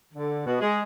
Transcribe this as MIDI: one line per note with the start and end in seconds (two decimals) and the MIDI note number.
0.14 0.44 50
0.46 0.58 47
0.60 0.81 56